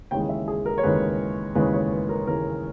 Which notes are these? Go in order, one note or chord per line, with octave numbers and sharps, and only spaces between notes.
D#2 C#3 E3 G#3 G5
E5
G#4
A#4
C#5
D#2 C#3 E3 G#3 B4
D#2 C#3 E3 G#3 B4
C#5
B4
A#4
D#2 C#3 E3 G#3 A#4